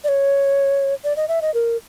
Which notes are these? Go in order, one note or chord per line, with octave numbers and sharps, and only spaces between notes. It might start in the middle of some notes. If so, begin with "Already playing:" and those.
D5
C#5
D5
D#5
E5
D#5
A#4